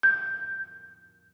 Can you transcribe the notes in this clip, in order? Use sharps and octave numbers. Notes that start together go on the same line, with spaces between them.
G6